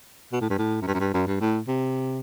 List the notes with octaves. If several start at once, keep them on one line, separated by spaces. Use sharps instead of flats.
B2
A2
G2
A2
F#2
G2
F#2
G2
F#2
G2
A2
C3